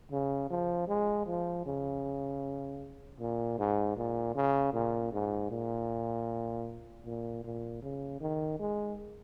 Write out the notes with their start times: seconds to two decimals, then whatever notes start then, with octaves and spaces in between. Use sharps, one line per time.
0.12 C#3
0.50 F3
0.88 G#3
1.27 F3
1.66 C#3
3.20 A#2
3.59 G#2
3.97 A#2
4.35 C#3
4.73 A#2
5.13 G#2
5.51 A#2
7.06 A#2
7.44 A#2
7.82 C#3
8.21 D#3
8.59 G#3